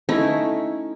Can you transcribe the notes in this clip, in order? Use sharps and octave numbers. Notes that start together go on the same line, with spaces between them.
A3 C#4 D#4 E4